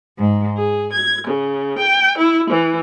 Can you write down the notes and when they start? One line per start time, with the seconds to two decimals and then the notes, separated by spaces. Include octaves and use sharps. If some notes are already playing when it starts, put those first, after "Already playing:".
0.17 G#2
0.56 G#4
0.91 G#6
1.26 C#3
1.78 G5
2.18 E4
2.49 E3